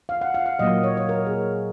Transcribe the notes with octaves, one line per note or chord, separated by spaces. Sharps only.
F5
F#5
F5
F5
A#2 F#3 A#3 D#5
C#5
C#5
A#4
G#4